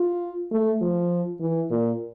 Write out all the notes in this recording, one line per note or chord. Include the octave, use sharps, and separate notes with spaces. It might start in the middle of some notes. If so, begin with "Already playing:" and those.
Already playing: F4
A3
F3
E3
A#2